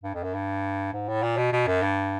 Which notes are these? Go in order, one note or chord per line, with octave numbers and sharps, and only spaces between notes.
G2
F2
F#2
G2
G#2
A2
A#2
B2
B2
F#2
G2